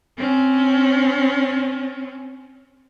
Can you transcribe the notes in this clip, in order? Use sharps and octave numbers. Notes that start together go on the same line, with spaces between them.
C4 C#4